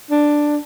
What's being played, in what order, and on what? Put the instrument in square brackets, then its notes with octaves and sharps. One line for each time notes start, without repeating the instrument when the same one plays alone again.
[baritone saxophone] D4